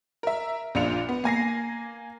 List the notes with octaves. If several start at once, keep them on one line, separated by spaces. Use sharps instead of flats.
A#4 E5
A#1 A#2 D4 F4 C#7 F7
B3
A#3 G#5 A#6 C7